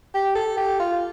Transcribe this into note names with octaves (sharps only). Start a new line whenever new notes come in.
G4
A4
G4
F4